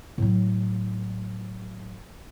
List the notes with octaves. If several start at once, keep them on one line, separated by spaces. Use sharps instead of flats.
A2 F#3